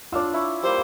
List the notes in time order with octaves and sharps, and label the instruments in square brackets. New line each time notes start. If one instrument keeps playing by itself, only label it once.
[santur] D4 F5 E6 [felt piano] F4 C#5
[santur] E4 C#6
[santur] G3 A#3 [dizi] C5